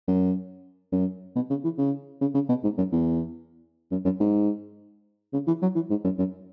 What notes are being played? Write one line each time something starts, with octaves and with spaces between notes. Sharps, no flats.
F#2
F#2
B2
C#3
E3
C#3
C#3
C#3
B2
G#2
F#2
E2
F#2
F#2
G#2
C#3
E3
F#3
E3
G#2
F#2
F#2